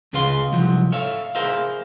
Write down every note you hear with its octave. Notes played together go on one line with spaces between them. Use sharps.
C#2 C#3 G#4 B4 F5 C6
C2 F3 F#3
A4 C#5 E5 F5
G#4 A#4 C5 E5 F5